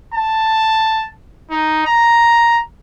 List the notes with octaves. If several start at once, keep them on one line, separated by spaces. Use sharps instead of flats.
A5
D#4
A#5